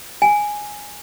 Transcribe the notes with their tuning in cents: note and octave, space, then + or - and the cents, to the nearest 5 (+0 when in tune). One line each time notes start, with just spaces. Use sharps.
G#5 +0